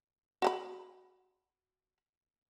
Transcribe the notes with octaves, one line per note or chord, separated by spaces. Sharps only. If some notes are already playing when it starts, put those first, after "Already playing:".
F#4 F#5 B5